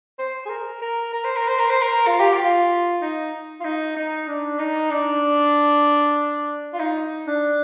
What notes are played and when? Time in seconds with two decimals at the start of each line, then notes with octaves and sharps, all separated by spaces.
0.19 C5
0.46 G#4
0.50 A#4
0.82 A#4
1.13 A#4
1.24 C5
1.36 A#4
1.48 C5
1.59 A#4
1.70 C5
1.82 A#4
2.07 F4
2.20 G4
2.34 F4
3.02 D#4
3.60 F4
3.64 D#4
3.97 D#4
4.28 D4
4.59 D#4
4.91 D4
6.74 F4
6.79 D#4
7.27 D4